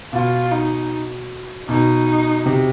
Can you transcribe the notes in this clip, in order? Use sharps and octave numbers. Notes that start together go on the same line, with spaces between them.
B2 F4
D#4
B2 D#4
C3